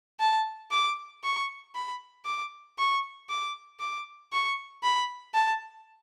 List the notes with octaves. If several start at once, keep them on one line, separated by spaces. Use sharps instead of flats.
A5
D6
C#6
B5
D6
C#6
D6
D6
C#6
B5
A5